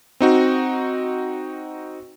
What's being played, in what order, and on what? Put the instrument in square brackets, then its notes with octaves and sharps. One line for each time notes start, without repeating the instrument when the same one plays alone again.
[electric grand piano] C4 D#4 F#4